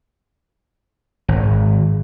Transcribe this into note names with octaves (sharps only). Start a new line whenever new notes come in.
G#1